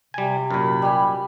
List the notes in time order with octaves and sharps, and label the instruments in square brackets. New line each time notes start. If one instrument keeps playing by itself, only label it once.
[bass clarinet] C3 [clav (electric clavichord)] G3 G#5
[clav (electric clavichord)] F#2 A#2 [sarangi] B5
[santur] G3 G#5